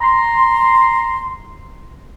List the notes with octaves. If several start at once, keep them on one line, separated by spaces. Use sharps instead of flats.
A#5 C6